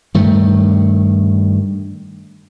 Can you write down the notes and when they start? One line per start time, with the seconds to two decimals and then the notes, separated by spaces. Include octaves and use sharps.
0.14 G2 D#3 A3